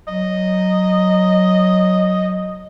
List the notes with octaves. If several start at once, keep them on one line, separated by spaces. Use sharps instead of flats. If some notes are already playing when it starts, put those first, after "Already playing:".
F#3 D#5